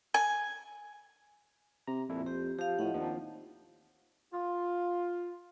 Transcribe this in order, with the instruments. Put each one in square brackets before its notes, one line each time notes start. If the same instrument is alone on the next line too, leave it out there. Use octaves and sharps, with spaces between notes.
[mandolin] G#5
[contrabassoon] C3 [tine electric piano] A#5
[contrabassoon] F2 [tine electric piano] A#2 E4 A4
[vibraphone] G4 [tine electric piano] C5
[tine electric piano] F3 [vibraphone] G4 F5
[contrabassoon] A2 [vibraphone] D#5 F#5
[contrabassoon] D#2 [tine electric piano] F3 C4 D4
[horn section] F4